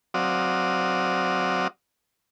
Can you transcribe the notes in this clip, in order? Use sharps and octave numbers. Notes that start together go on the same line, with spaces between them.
F#3 C4 F#4 D5 F5 D#6